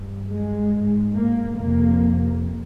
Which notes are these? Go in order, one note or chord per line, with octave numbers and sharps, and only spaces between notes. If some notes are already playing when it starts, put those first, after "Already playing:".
Already playing: G2
G#3
G#2
A#3
F2 C3 A#3